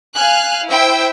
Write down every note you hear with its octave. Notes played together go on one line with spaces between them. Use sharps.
F5 G#5 F6 F#6
E4 C5 E5 G5 E6